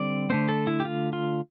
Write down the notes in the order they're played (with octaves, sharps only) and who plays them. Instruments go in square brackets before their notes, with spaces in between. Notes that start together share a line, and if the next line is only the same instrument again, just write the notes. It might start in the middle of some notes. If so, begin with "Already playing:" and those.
Already playing: [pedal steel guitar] D3 G3 C4 D5
D3 A3 C4 C5
A4
E4
G4
F4
F4